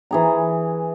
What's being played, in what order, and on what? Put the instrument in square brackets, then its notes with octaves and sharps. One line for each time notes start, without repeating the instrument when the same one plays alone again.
[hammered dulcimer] E3 G#4 A#5